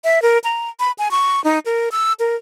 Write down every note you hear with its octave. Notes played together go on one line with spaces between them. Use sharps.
E5
A#4
A#5
B5
G#5
C#6
D#4
A#4
E6
A#4